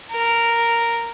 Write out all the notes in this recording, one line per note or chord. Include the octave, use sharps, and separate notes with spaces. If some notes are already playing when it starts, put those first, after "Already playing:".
A#4